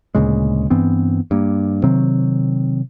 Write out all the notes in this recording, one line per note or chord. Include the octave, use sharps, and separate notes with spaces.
D2 A#2 C#3 G#3
G2 E3 B3 C4
G2 A#3
C3 D#3 F#3 C4